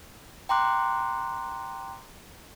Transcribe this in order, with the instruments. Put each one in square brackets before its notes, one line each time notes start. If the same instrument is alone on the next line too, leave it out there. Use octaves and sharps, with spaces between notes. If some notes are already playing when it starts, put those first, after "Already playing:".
[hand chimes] G5 A#5 C6 D6 F#6